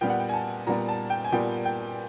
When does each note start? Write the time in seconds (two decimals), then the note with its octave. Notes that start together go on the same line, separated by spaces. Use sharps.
0.01 A#2 G3 B3 G5
0.10 F#5
0.20 G5
0.29 G#5
0.34 A5
0.67 A#2 G3 B3 A#5
0.89 A5
1.10 G5
1.24 G#5
1.32 A#2 G3 B3 G5
1.65 G5